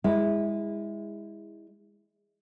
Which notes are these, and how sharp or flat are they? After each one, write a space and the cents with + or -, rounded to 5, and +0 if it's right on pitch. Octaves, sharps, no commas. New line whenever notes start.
G#3 -25 E4 -15